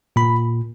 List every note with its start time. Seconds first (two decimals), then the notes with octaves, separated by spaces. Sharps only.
0.16 A#2 B5